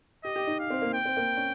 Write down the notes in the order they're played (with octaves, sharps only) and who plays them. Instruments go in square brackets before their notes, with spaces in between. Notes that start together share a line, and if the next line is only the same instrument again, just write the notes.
[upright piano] G4 [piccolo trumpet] D#5
[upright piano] G4
D#4
[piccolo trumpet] F5
[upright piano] C4
A#3
[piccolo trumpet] G5
[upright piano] C4
A#3
C#4